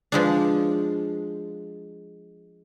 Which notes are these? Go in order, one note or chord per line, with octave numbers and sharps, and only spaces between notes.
F3 G#3 D4